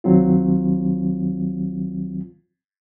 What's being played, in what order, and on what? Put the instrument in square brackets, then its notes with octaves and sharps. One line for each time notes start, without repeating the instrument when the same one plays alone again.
[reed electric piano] C2 D#3 F#3 C4 F4